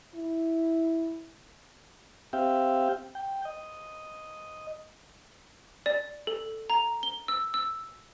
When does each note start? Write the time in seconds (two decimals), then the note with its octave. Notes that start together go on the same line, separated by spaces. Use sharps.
0.15 E4
2.33 C4 G4 E5 F5 G5
3.15 G5
3.45 D#5
5.86 D5
6.27 A4
6.70 A#5
7.03 G7
7.28 E6
7.54 E6